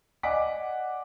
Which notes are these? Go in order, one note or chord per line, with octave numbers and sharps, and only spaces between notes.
D5 D#5 F#5 G#5 D6 B6